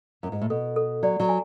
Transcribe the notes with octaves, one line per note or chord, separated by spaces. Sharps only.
F#2
G#2
A2
B2 A4
A4
F#3 D5
F#3
G#5